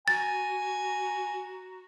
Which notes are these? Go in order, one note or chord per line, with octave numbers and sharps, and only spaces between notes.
F#4 G#5 A#5 A6